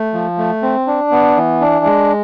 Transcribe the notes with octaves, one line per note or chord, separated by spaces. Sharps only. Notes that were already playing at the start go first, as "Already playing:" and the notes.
Already playing: A3
F3
A3
C4
D4
B3
E3
D4
G#3